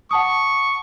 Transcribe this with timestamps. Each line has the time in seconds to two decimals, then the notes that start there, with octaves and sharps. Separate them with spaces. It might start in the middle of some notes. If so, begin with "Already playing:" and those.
0.11 F#5 A5 C#6 D#6